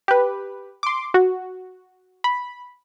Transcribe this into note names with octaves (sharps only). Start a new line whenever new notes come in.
G4 B4
C6 D6
F#4
B5